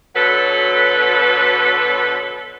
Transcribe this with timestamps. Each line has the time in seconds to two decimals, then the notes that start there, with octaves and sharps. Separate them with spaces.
0.16 B2 D3 F#3 A4 B4